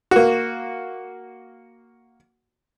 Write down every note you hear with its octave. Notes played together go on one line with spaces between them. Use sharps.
A#3 F#4